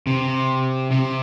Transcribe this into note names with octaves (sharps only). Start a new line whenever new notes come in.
C3
C3